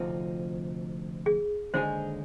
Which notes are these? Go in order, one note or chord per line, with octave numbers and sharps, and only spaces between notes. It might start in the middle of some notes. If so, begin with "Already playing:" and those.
Already playing: D2 C3 F3 C4 D#4
G#4
D#2 D3 G#3 D#4 G#4 C5